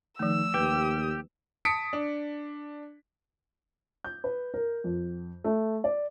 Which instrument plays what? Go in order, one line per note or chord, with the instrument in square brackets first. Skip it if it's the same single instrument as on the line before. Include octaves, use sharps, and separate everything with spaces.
[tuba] D#3 [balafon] F3 A3 [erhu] E6
[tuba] D#2 [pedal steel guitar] G4 [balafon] B4
[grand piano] A5 D#6 B6 C#7 D7
D4
[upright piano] G6
B4
A#4
F2
A3
D5